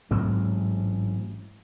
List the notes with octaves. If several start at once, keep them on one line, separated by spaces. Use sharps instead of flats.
A1 G#2 F#3 C4